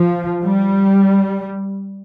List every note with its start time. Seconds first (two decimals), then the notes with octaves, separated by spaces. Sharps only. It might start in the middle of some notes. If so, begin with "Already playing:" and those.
Already playing: F3
0.42 G3